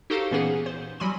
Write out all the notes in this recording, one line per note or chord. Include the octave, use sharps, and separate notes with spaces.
D#4 F#4 G4 A4 C5 F5
A#2 E3 B3 C#4 G#4 F#5
C5
F#3 G3 G#5 B5 C6 D#7